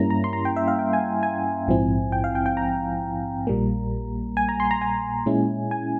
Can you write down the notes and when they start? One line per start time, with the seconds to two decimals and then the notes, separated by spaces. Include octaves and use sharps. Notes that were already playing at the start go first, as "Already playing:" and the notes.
Already playing: G2 G3 A#3 C#4 E4 A#5
0.10 A#5
0.24 C6
0.33 A#5
0.45 G5
0.56 E5
0.68 F5
0.79 G5
0.93 G#5
1.23 G#5
1.67 A#1 G#2 F3 C4 E4
2.12 G5
2.24 F5
2.35 G5
2.46 G5
2.57 A#5
3.47 A#1 A#2 G3 A#3
4.37 G#5
4.49 A#5
4.60 C6
4.71 A#5
4.82 G#5
5.26 A#2 G#3 C#4 E4
5.71 G#5